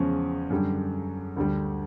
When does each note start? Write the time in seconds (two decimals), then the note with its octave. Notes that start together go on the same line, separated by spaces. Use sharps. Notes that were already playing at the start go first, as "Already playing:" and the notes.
Already playing: E2 C#3 F3 G#3 C#4
0.50 F#2 D3 G3
1.36 D2 D3 G3